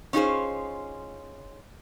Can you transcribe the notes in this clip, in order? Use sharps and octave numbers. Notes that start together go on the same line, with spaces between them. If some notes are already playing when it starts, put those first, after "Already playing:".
C#4 D#4 F4 F#4 G#4 C5